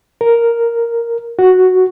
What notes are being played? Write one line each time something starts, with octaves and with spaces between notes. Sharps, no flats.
A#4
F#4